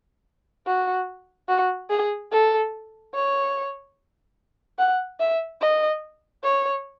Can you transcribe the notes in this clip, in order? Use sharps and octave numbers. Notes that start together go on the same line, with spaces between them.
F#4
F#4
G#4
A4
C#5
F#5
E5
D#5
C#5